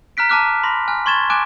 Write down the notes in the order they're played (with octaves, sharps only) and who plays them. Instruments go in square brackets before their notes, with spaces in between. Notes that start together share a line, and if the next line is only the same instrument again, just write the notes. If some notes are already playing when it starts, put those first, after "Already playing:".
[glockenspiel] A#5 F6 F#6 B6 D7
A5 A#5 D6 F6 F#6
B5 C6 A#6
G#5 F6 F#6
C6 C#6 G#6 A6 E7 G7
G#5 D6 F#6 D7 E7